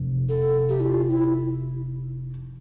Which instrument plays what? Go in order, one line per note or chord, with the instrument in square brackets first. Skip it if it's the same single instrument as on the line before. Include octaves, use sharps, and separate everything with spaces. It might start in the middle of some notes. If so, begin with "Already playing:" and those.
Already playing: [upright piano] F1
[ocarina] A4
G4
E4
F4
E4